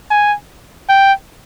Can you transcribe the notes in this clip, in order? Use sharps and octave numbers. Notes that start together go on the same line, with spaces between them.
G#5
G5